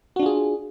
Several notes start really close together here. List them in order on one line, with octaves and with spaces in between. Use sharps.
F#4 D4 F4 G#4